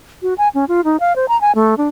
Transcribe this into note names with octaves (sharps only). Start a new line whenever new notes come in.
F#4
G#5
C#4
F4
D#4
F5
C5
A#5
G#5
A3
D4